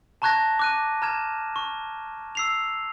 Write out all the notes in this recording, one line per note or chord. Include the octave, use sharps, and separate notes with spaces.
A5 A#5 C#6 F#6 G#6 A#6
D6 F#6 D#7
A#5 F6 G#6 E7
C#6
E6 C7 F7